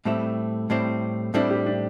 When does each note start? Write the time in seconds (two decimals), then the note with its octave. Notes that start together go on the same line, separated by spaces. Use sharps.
0.05 A2 G3 A3 C4 E4
0.70 A2 G3 C4 E4
1.34 A2 G3 C4 D4 E4
1.50 G4
1.66 D4